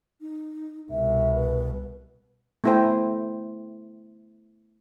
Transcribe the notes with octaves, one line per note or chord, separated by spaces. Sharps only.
D#4
C2 B2 E5
B4
A3 B3 E4 A4 C5 G5